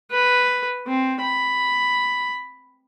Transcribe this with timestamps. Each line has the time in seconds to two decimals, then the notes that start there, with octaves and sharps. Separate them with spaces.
0.11 B4
0.87 C4
1.21 B5